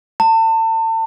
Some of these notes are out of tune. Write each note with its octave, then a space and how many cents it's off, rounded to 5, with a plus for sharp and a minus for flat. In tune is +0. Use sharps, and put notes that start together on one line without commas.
A5 +35